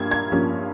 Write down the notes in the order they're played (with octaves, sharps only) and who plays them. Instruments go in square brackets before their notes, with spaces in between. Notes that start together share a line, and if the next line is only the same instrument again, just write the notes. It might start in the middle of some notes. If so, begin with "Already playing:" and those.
Already playing: [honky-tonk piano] G2 F3 A#3 G#6
G#6
G2 F3 A#3 C#4